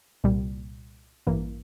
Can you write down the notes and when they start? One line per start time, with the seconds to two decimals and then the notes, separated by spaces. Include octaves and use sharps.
0.24 C2 A#2 G3
1.27 A1 G2 E3 A#3